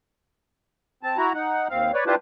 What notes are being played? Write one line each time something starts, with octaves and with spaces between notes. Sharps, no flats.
C4 A5
E4 F#4 A#5
D#4 F#5
D#2 C4 F5
B4 C#5 D5
D4 E4 F4 G4 B4 C5